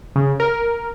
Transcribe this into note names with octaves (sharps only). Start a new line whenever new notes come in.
C#3
A#4